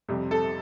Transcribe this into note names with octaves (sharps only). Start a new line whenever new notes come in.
F2 C3 G3
A4